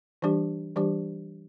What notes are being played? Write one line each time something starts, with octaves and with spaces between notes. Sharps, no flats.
E3 G3 D4 G4
E3 G3 D4 G4